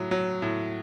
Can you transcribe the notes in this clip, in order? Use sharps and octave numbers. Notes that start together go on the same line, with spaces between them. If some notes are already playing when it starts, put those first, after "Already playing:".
Already playing: A2 F#3
F#3
A2